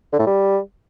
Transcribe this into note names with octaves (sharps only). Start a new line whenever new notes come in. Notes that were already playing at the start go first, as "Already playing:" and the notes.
D3
A2
G3